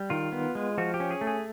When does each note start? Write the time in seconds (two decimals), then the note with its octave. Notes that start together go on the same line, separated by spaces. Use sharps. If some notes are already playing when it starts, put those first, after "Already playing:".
Already playing: G3
0.10 D#3 F4
0.32 B3
0.55 G#3
0.78 F3 F#4
0.94 G4
1.00 C#4
1.11 G#4
1.21 A3
1.27 G#4